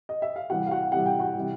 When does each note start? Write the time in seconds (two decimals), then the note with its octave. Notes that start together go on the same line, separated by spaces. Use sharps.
0.09 D#5
0.22 E5
0.36 F5
0.50 C3 E3 G3 F#4 F#5
0.67 F5
0.71 F#4 F#5
0.92 C3 E3 G3 F#5
1.06 G5
1.20 F#4 F#5
1.35 C3 E3 G3